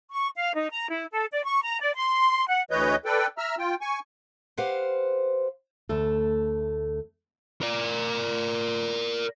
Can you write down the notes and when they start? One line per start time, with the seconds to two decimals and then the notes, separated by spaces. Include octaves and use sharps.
0.11 C#6
0.36 F5
0.55 D#4
0.70 A#5
0.90 E4
1.13 A4
1.32 D5
1.45 C#6
1.63 A#5
1.80 D5
1.95 C6
2.48 F#5
2.71 D2 E3 B4 C#5 D#5 G6
3.05 A4 B4 D5 G5
3.38 E5 A#5 E6 F6
3.59 F4 G5
3.81 G#5 C#6
4.57 G4 B4 C5 F5 F#5
5.89 D2 A3 A4
7.62 A#4 D5